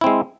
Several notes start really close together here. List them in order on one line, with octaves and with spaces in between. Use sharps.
E4 C4 G#3